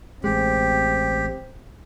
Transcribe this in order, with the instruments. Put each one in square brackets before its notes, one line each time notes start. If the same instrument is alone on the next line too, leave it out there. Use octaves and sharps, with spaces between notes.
[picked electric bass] A1 G#3 [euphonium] C4 [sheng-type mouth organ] G4